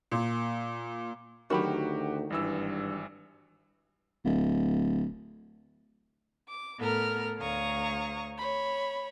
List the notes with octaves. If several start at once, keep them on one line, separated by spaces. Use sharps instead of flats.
A#2
D2 D#3 F#3 F#4 G4 B5
G#1 G2 E3 E6
D1
D6
A2 B3 A4 A#4 F6
D2 C#5 F5 A#5 C#6 D#6
C#5 B5